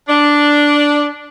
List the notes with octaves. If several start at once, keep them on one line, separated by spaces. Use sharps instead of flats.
D4